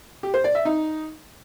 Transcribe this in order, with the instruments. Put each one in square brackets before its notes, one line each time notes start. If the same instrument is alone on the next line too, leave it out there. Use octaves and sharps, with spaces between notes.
[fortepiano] G4
C5
D5
E5
D#4